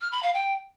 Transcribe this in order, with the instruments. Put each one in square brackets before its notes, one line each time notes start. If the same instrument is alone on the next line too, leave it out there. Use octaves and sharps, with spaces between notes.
[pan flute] F6
B5
F5
G5